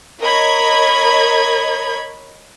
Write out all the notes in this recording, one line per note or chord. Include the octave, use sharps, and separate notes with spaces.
A#4 C#5 D#5 B5 G#6